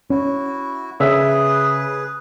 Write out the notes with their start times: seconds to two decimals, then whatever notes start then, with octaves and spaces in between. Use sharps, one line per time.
0.10 C#4 E4 F#4
1.00 C#3 G#4 B4 E5 E6